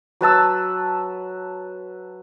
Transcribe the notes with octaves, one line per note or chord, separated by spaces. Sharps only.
F#3 B4 A5 E6